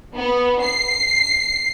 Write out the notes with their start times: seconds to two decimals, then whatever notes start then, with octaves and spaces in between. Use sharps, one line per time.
0.17 B3
0.64 C7